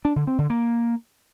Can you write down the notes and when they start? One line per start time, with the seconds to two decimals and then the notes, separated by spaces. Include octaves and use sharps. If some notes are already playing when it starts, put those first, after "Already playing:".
0.05 D4
0.16 D3
0.27 C4
0.38 D3
0.50 A#3